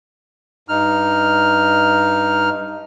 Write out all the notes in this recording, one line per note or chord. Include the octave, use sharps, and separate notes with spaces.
G2 D#4 F6